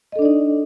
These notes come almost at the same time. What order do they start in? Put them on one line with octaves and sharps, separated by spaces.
D#5 A4 D4 D5 D#4